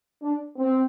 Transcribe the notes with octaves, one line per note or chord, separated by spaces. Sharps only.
D4
C4